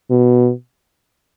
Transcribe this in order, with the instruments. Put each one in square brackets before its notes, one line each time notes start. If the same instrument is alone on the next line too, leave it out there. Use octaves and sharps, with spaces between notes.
[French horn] B2